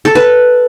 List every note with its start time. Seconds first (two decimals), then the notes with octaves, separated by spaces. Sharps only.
0.05 A4
0.15 B4